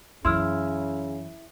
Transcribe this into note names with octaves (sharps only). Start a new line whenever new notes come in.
F#2 C#3 E3 E4 C6 E6 F6